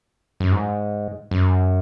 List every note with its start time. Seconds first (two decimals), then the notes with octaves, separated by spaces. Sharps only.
0.40 F#2
0.52 G#2
1.31 F#2